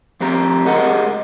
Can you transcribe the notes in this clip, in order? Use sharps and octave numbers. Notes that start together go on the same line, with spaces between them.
F2 C4 G4 A#5
G#3 G4 G#4 A#4 D#5 F#5